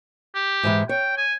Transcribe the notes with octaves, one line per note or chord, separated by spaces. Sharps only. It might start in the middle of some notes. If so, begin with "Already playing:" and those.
G4
G#2 E3 G#3
C#5 G5
G#5